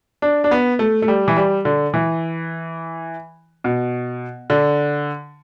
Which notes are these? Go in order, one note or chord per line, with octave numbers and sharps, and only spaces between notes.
D4
D4
B3
A3
A3
G3
E3
G3
D3
E3
B2
D3